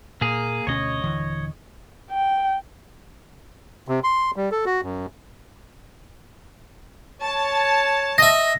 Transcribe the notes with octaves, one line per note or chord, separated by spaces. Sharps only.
A#2 A#3 G#4
D2 B2 C#4 C#5 D#5
D#1 D3 E3
G5
C3
C6
G3
A4
F#4
F#2
C#5 A5
D#5 E5 A#6